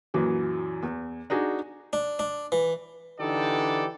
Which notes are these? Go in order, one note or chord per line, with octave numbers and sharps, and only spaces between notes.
F#2 A#2 E3 F#3
E2
D4 D#4 F#4 G#4
D4
D4
E3
D3 E3 D#4 G4 A4 D5